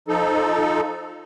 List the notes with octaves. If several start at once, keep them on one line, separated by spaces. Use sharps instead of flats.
F3 D#4 A4